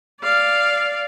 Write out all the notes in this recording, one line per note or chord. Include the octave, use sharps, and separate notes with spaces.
D5 F5